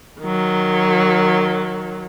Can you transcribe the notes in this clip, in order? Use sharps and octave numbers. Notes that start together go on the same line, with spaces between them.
D#3 F#3